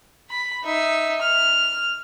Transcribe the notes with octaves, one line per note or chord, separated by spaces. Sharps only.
B5
D#4 E5
F6